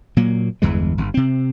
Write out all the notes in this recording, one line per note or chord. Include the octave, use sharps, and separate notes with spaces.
A#2 F#3 A#3
G1 E2 E3 G#3
G1
C3 C4